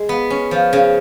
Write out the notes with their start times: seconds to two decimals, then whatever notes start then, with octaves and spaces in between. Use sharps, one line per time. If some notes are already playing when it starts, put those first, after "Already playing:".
Already playing: G#3
0.09 B3
0.30 C#4
0.51 F3
0.73 C#3